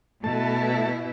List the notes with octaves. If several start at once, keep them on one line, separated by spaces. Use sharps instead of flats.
B2 A3 E4 A5